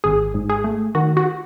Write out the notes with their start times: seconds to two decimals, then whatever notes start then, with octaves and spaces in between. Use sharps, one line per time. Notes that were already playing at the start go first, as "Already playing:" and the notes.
0.04 G#1 G#4
0.34 G#2
0.49 G#4
0.64 A3
0.95 D#3 F#4
1.17 F#4